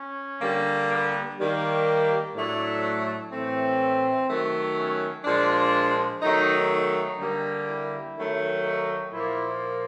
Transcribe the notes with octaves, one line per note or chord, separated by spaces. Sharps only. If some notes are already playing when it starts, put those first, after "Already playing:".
Already playing: C#4
D3 G3 A#3
B3
D#3 G3 A#3
A2 F#3 A3 D4
A2 E3 A3 C4
D#3 F#3 A3
C#4
A#2 F3 G#3 D4
D#3 F#3 A3 D#4
D#4
D3 G3 A#3
E4
D#3 F#3 A3
D#4
A#2 F3 A#3 E4